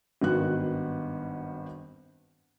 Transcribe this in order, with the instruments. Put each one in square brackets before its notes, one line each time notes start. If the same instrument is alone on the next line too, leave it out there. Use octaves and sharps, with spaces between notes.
[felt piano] G#1 G2 D#3 B3 F#4 F#6